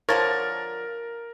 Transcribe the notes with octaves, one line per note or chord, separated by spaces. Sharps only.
D3 F3 A#4 C#5 A6